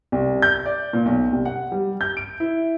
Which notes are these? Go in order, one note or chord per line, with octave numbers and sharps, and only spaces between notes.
C2
G6
D5
A#2
B1
C2
F#5
G3
G6
D7
E4